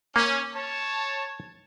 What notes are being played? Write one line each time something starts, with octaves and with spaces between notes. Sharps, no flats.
A#3 C#4
C#5 A5